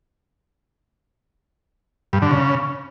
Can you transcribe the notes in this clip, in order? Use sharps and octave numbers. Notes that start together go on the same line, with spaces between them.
G2
D3
C#3